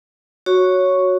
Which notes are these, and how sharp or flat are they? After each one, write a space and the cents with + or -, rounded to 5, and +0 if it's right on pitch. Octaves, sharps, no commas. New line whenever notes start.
F#4 +0 C#5 +0 C#6 +0